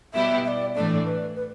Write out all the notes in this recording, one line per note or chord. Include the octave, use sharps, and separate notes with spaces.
B2 G3 B3 E4 G4 E5
E5
D5
A2 E3 A3 D4 D5
B4
B4